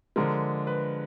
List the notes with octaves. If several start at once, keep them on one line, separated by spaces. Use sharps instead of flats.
D3 F3 G#3 A#4
B4